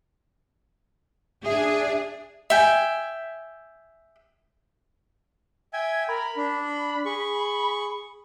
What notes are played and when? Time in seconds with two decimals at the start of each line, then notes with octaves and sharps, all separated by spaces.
1.46 D4 G#4 E5
2.50 E5 G5 G#5
5.73 E5 G5 G#5 G#6
6.09 A#4 B5
6.37 D4
7.05 G#4 C#6